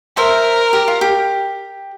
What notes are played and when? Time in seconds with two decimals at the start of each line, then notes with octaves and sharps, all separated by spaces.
0.17 A#4 C5 E5
0.73 G4
0.88 F4
1.01 G4